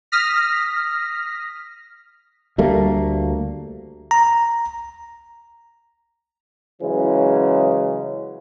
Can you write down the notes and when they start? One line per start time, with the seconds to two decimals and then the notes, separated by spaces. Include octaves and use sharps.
0.12 D#6 F6 A#6 B6
2.58 D2 G3 A3 A#3
4.11 A#5
6.82 C#3 E3 F#3 G#3